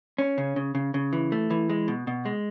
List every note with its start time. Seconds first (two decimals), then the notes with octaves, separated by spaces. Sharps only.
0.18 C#4
0.38 C#3
0.56 C#3
0.75 C#3
0.94 C#3
1.13 E3
1.32 A3
1.50 E3
1.70 G#3
1.88 B2
2.07 B2
2.26 G#3